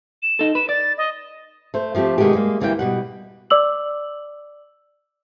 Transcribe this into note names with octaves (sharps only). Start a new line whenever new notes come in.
E7
D#4 A4
B4 E7
D5 A6
D#5
A3 C5
F3 A3 C4 G4
B2 D#3 G#3 A3 B3 G4
G3 G#3 A#3
D2 E3 G3 A#3 F5 G5
B2 G3 F#5
D5 D6 E6 F#7